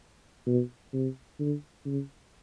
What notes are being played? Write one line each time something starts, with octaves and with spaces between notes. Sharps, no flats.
B2
C3
D3
C#3